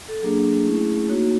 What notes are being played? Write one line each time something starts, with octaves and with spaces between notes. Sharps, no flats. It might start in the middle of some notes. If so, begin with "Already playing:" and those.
A4
F#3 A#3 D4 G#4
A3 C#4 E4
A#3 D#4 F#4 C#5